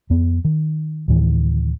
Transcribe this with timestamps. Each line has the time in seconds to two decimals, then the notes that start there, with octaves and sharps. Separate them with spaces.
0.10 F2 B3
0.45 D#3
1.08 D2 A2 D#3 E3